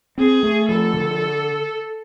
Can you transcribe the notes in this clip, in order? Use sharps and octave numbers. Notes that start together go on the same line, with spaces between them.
C4 G#4
A3
F3 A4
D3